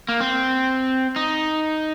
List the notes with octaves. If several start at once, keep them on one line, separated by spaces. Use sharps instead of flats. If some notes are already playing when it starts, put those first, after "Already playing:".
A#3
C4
D#4